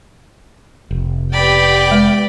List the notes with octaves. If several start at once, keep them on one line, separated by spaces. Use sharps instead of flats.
F1
B3 G4 D5 G5 B5
G#3